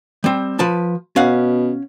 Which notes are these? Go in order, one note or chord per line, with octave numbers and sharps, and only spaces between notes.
G3 C4
F3 B4 A5
B2 C#4 F5 F#5